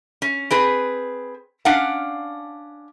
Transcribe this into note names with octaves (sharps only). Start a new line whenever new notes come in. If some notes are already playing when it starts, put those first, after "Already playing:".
C#4
C4 G#4 B4
C#4 D4 F5 F#5